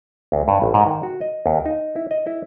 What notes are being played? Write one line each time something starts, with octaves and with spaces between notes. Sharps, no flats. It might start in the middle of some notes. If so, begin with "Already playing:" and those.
D2
G2
A1
G#2
D#3
F#4
D#5
D#2
D#4
E4
D#5
E4